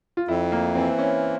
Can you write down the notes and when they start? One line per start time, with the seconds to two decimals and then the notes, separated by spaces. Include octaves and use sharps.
0.17 F4
0.28 F2 E4
0.52 A#3
0.75 E3 C4
0.99 C#4